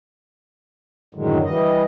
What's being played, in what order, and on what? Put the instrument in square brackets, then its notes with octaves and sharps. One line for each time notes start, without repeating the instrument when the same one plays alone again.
[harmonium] F#2 A2 D3 D#3 F#3 G#3
E3 G3 D#5